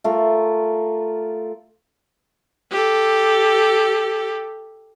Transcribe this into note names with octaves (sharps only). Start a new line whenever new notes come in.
A3 F4 A#4
G4 A4